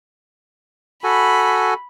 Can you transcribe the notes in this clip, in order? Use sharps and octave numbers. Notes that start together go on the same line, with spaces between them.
F#4 A4 G#5 B5